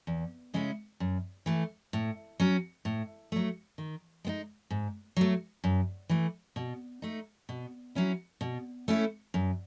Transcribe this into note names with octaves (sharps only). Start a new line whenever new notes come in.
E2
C#3 G#3 C#4 E4
F#2
E3 A3
A2
F#3 C#4
A2
F#3 A3
D#3
G#3 B3 D#4
G#2
F#3 A3
F#2
E3 A3
B2
A3 D#4
B2
F#3 C#4 E4
B2
A3 C#4 E4
F#2